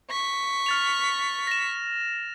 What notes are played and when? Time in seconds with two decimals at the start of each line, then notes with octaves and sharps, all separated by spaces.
0.10 C#6 B6
0.66 F6 A6 F7
1.47 A#6 E7